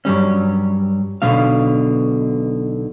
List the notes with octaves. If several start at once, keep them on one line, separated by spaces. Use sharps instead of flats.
G2 F#3 G3 C#4
B1 B2 D3 F3 C4 F5